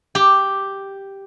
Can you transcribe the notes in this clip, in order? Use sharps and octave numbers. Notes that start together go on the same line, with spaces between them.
G4